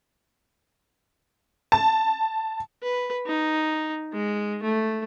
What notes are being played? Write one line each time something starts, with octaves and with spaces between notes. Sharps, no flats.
A5
B4
D#4
G#3
A3